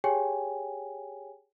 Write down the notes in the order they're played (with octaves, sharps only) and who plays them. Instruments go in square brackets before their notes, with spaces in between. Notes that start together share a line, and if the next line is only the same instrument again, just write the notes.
[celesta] G4 G#4 C#5 G5 G#5